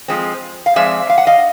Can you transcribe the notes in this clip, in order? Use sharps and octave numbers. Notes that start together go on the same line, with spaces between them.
F3 G#3 C4
F5
F3 G#3 C4 D5 E5
F5
F#5
D#5 F5